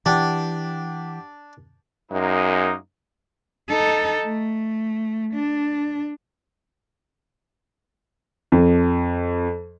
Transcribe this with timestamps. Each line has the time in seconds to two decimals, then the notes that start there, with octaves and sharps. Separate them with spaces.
0.06 E3 D4 G4 F#5 G5
2.11 F#2 G#3 A#3 D#4
3.68 D#4 A4
4.24 A3
5.34 D4
8.52 F2